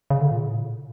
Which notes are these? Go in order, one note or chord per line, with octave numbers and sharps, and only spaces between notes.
C#3
D3
A#2
A2
A#2